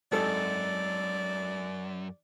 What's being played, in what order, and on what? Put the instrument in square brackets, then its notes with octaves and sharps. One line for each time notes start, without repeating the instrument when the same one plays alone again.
[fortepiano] G#1 A4 [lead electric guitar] F#2 [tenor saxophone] D5